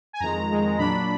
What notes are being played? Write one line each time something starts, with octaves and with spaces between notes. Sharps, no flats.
G#5
F2 D#3 G#3 A#5
F2 D#3 G#3
A#2 F#3 D4 B5